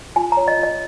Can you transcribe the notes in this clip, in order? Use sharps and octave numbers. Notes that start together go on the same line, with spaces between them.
F4 G#5
C#5 A#5
D#5
F4 D#5